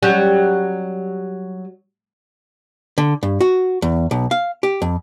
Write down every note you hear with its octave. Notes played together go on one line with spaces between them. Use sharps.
F#3 G3 C#4
D3
G2
F#4
E2
B1
F5
G4
F2